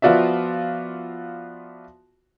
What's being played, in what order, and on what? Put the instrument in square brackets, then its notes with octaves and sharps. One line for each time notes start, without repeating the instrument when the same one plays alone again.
[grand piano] F3 B3 F4 F#4 D5 E5